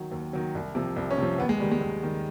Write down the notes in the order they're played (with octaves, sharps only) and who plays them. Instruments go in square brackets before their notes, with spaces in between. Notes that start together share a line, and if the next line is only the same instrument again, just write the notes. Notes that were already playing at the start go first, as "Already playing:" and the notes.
Already playing: [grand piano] D#3 F#3
D#2
D#3 F#3
C2
C3 F3
C2
C#4
C3 F3
D#2 B3
G#3
D#3 G3
G#3
D#2
D#3 G3